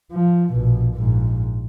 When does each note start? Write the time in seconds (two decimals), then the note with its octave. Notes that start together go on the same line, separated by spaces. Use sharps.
0.12 F3
0.52 A#1 B2
0.97 A#1 G#2